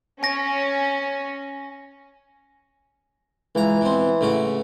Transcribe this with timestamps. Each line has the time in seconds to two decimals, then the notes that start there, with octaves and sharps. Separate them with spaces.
0.23 C#4 G#5 A#6
3.55 C#2 E3 A#5
3.81 B2 C4
4.21 A1 C#3 F#4